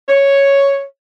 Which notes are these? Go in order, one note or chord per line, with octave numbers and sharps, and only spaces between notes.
C#5